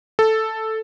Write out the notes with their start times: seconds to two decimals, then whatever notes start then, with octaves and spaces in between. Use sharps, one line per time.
0.19 A4